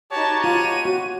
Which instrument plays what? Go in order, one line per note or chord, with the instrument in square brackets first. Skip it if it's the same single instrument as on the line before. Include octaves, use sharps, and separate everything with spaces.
[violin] D#4 A5 [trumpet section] F#4 G4 C#5
[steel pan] F4 [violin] D#7
[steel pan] F#4